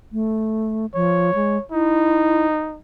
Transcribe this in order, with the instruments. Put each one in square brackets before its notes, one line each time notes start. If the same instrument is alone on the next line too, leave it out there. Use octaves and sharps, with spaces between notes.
[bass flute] A3
[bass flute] F3 [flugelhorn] C#5
[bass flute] G#3
[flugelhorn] D#4 [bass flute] E4